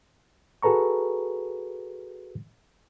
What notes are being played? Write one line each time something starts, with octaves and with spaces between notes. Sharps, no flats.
F#4 G#4 A4 B4 A#5 C#6